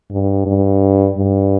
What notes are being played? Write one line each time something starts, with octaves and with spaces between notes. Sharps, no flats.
G2
G2
G2